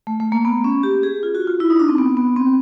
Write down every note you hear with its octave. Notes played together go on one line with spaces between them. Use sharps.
A3
A3
A#3
B3
C#4
G4
G#4
F4
F#4
F4
E4
D#4
D4
C4
B3
B3
C4